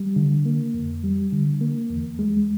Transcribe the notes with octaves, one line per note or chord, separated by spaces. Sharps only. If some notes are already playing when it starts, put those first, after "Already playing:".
Already playing: G3
D3
A#3
F2
G3
D3
A#3
E2
G#3